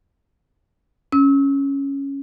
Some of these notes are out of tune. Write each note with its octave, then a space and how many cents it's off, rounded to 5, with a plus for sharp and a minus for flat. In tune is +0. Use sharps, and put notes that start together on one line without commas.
C#4 +0 E6 -30